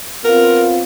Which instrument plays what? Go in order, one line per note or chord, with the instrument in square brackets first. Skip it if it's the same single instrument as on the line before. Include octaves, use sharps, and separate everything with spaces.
[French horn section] B3 C4 F4 [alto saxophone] A#4